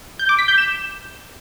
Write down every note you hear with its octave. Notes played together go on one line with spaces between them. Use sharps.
G6
D6
B6
G6
E7